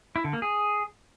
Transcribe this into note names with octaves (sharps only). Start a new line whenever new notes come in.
E4
D3
A#3
G#4